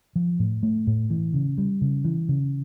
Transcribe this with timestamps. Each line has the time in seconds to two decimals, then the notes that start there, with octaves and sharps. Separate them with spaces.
0.16 F3
0.39 A2
0.63 A3
0.87 A2
1.10 E3
1.34 C#3
1.58 G3
1.81 C#3
2.04 E3
2.29 C#3